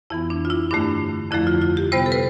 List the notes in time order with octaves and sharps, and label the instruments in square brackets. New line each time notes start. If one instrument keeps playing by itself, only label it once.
[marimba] F2 E3 B3 E4
D4
F4
E4
G2 D3 A3 D4
F2 D3 F3 A3 E4
F4
F4
G4
C3 G3 B3 C5
A4
B4